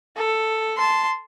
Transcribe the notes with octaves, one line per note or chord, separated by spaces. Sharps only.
A4
A5 C6